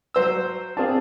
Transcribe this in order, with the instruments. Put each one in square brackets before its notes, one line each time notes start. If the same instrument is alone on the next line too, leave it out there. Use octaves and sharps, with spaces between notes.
[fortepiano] F#3 C5 E6
[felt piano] C4 A5 [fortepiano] D4 F4 G#4